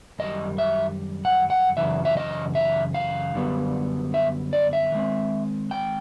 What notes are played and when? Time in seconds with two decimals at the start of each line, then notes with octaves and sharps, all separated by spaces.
0.19 F#2 D#3 G3 D#5
0.58 E5
1.25 F#5
1.50 F#5
1.77 F#2 C#3 E3 E5
2.05 E5
2.17 D#5
2.55 E5
2.94 F5
3.34 F#2 D3 G3 B3
4.14 E5
4.53 D5
4.73 E5
4.92 D#3 G#3 C4
5.71 G5